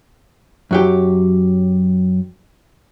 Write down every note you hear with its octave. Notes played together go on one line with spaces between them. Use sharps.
F#2 F#3 G4